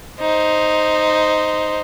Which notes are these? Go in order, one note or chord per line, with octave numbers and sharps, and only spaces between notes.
D#4 C5